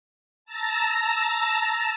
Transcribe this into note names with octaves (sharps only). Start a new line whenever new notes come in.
A5 A#5 E6 A6 A#6